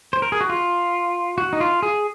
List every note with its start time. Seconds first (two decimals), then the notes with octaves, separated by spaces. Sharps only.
0.13 C5
0.22 A#4
0.32 G#4
0.41 F#4
0.49 F4
1.38 F#4
1.53 D#4
1.60 F4
1.82 G#4